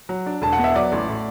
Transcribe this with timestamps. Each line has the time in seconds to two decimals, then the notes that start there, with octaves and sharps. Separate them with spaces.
0.09 F#3
0.26 D4
0.42 E1 A5
0.53 F#5
0.59 B3
0.64 E5
0.75 F#3 D5
0.92 A1
1.08 A2